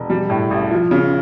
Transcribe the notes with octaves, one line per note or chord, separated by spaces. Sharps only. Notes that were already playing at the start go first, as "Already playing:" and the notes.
Already playing: E1
G3
A2
A1
F3
C#3